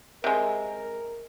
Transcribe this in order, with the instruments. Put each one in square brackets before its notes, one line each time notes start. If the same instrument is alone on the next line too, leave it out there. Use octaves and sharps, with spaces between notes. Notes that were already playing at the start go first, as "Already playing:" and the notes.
[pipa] C3 G#3 [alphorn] A#4